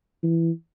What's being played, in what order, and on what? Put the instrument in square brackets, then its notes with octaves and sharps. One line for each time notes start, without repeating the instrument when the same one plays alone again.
[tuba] E3